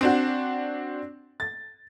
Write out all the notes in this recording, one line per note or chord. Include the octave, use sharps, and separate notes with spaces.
C4 D4 F#4
A6